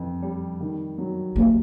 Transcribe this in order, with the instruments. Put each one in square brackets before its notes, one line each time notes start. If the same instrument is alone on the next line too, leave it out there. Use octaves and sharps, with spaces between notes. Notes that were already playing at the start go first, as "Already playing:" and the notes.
Already playing: [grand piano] F2 E3
G3
D#3
F#3
[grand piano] D#2 [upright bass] A#3